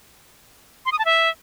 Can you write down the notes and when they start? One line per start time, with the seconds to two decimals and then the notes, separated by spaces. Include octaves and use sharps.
0.86 C6
0.92 D#6
0.99 A5
1.05 E5